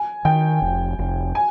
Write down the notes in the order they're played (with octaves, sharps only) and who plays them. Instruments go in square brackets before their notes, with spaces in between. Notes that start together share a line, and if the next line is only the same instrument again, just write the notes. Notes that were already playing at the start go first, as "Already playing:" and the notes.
Already playing: [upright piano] G#5
[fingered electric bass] D#3 [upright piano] G5
[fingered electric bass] F1
F1
[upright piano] G#5